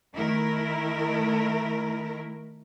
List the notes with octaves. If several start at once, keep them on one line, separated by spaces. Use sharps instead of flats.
D#3 A3 E4 A#4